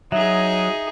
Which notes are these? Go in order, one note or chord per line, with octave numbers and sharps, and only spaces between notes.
F#3 D#4 G#4 E5